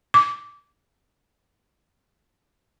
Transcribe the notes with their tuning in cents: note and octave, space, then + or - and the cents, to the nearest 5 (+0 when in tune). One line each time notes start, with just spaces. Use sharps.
D6 -15